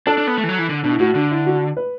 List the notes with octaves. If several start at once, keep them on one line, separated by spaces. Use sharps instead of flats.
D4 A4
D4
B3
A3
E3
F#3
E3
D3
B2 D4
E4
A2 F#4
D3 D4
E4
F#4
B4